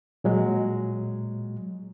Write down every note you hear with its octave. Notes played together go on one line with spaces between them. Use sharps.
A#2 F#3 G#3